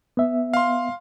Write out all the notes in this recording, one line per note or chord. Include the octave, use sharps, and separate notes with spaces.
B3 E5
F5 C6